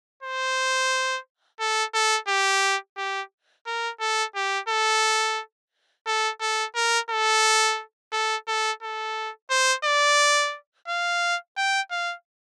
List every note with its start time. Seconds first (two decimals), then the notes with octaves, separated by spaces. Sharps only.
0.22 C5
1.60 A4
1.94 A4
2.28 G4
2.97 G4
3.66 A#4
4.00 A4
4.35 G4
4.69 A4
6.06 A4
6.41 A4
6.75 A#4
7.10 A4
8.12 A4
8.47 A4
8.82 A4
9.50 C5
9.84 D5
10.88 F5
11.57 G5
11.91 F5